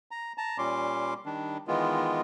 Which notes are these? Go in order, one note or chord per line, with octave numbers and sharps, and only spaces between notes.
A#5
A5 A#5
A#2 G3 C#4 C6 D6
D#3 G3 D4
D#3 E3 G#3 B3 F4